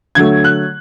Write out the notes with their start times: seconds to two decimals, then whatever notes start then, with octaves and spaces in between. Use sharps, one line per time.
0.15 D3 F#3 A3 G#6
0.44 F#6